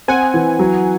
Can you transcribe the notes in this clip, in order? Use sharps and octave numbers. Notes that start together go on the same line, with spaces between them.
C4 F#5 G#5
E3
F#3